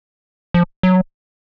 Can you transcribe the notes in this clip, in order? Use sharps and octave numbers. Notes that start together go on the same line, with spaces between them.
F3
F#3